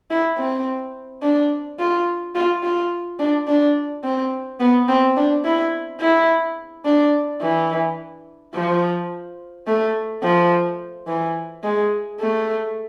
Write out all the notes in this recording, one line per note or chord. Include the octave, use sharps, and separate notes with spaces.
E4
C4
D4
F4
F4
F4
D4
D4
C4
B3
C4
D4
E4
E4
D4
E3
F3
A3
F3
E3
G#3
A3